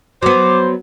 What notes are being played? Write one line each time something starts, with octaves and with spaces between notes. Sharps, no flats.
F#3 B3 C5 D6